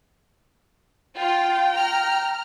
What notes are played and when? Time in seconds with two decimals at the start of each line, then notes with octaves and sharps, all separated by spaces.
1.18 F4 G5
1.74 A#5 F6